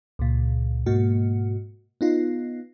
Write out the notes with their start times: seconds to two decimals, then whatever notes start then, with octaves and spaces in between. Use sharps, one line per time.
0.19 C#2 A#2
0.86 G#2 B2 A#3 F#4
2.01 B3 D#4 F4